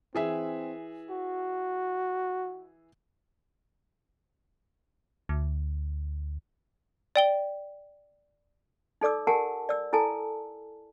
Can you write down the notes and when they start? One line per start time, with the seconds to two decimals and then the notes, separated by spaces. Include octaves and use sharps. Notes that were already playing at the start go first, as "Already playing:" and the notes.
0.15 E3 C4 G#4 E5
1.11 F#4
5.29 D2
7.16 D5 G5 G7
9.01 D#4 A4 D5 D6 E6
9.27 G4 A#4 F#5 G#5 A5
9.69 D5 E6
9.93 E4 A4 G#5 A5